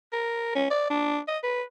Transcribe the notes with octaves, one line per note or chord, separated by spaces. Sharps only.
A#4
C#4
D5
D4
D#5
B4